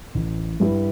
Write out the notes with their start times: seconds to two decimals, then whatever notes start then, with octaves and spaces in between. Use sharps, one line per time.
0.15 A1
0.60 G2 G3 E4 G4